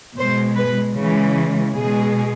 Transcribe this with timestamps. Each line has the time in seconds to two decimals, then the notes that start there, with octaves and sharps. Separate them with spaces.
0.17 B2 G#3 C5
0.57 B4
0.96 C#3 E3 G#3
1.75 B2 G#3 G#4